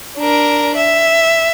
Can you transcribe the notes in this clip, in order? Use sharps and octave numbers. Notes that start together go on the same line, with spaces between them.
D4 A#4
E5